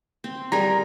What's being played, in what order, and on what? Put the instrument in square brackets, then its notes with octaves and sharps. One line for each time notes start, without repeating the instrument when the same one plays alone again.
[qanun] C4
[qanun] G3 G#4 A#4 [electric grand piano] A#5